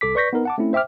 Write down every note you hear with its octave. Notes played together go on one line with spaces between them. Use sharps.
C2 A4 D6 B6
B4 D5 C#6 G6 A#6 B6
B3 D#4 A#4
F#5 A5 D6
A3 C4 C#4 E4
C5 E5 G5 D6 F6